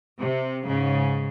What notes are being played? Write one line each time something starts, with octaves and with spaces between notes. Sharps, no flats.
C3
G#2 C#3